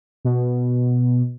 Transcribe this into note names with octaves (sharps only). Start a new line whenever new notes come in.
B2